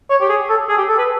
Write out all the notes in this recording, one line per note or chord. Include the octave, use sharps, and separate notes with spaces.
C#5
G4
G#4
A4
G#4
G4
A4
B4